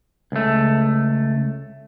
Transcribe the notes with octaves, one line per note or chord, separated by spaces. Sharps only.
C#2 A3